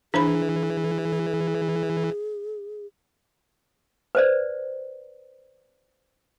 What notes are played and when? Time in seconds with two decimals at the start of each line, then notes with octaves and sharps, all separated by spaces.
0.14 E3 D4 G#4 C5 B5
4.15 B4 C5 D5